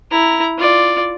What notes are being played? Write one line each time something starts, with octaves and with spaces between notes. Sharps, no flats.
E4 A#5
F4 D5